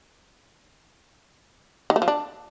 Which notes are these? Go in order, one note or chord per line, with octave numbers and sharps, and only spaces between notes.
D#3
A3
F3
D4